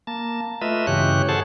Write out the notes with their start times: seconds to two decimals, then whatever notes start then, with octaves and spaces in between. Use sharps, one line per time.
0.07 A#3 A5
0.61 A3 F4 B4 D#5 E5
0.87 G2 C#3 E3 G4 C#5 F#6
1.29 G#4 A4 C5 C#5 F#5 A5